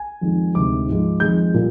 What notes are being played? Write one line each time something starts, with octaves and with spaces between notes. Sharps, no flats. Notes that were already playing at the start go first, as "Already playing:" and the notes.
Already playing: G#5
F2 D#3 G#3
D2 C3 D#3 G#3 D6
G#2 F3 G#3
F2 D#3 G#3 G6
A#2 G3